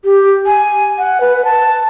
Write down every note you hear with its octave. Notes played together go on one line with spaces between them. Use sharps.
G4
G#5
F#5
B4
A5